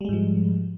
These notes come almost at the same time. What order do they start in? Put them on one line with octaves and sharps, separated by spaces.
G3 G#3 G#2 F3